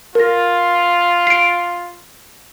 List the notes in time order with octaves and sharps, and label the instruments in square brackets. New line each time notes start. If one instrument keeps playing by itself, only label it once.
[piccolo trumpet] F4 [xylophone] A#4 A#6
[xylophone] C7 D7